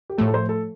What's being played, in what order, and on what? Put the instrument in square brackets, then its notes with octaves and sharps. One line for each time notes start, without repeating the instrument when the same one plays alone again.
[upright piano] G4
[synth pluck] A2 F3 A3 [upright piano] A4
[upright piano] A4
C5
A4